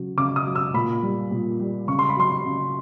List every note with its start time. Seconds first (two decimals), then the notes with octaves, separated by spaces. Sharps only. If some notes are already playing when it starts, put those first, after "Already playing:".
Already playing: C#3 F#3
0.17 C#3 D6
0.36 D#6
0.46 F#3
0.55 E6
0.74 A#2 B5
1.02 G3
1.31 A#2
1.60 G3
1.87 C#3 C#6
1.99 C6
2.09 B5
2.17 F#3 C6
2.44 C#3